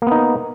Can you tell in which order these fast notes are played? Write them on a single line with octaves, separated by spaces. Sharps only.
A#3 B3 D#4